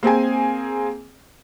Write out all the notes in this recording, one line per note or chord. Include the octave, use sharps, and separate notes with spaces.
A#3 C4 G#4 G#5